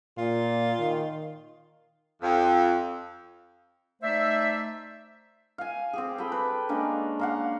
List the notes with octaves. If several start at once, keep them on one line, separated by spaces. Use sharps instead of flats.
A#2 F4
D#3
F2
A3 D#4 C5 D5 E5
F5 G#5
C4 G4 G#4
G4 A4 G5 B5
B4
G#3 A#3 C#4 D4
A#3 F5 F#5